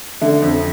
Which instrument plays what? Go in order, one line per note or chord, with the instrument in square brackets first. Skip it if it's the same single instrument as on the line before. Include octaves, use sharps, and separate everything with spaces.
[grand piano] D3 [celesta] E5
[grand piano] F2